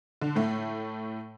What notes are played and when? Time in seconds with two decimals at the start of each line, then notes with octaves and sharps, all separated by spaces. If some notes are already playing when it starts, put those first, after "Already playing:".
0.22 D3
0.36 A2 A3